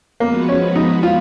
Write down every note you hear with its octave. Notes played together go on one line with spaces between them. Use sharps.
F3 G#3 A#3 B3 F#4 B4
C#4
D#4
F4